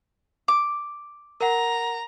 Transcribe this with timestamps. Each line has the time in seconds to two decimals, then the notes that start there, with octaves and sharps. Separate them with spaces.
0.48 D6
1.41 A#4 F#5 A#5